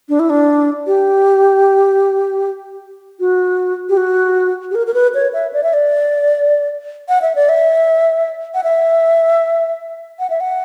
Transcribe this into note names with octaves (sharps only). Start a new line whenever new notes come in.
D4
E4
D4
G4
F#4
G4
F#4
G4
A#4
A#4
B4
C#5
E5
D5
E5
D5
F#5
E5
D5
E5
F#5
E5
F#5
E5
F#5